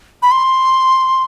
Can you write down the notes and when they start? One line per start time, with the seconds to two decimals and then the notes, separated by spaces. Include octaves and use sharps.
0.22 B5
0.31 C6